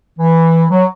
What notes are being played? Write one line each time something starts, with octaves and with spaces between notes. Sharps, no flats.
E3
F#3